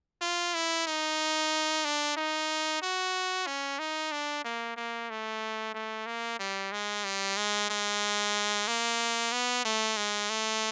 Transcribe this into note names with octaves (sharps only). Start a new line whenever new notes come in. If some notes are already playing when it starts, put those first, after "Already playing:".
F4
E4
D#4
D4
D#4
F#4
C#4
D#4
D4
A#3
A#3
A3
A3
A#3
G3
G#3
G3
G#3
G#3
A#3
B3
A3
G#3
A3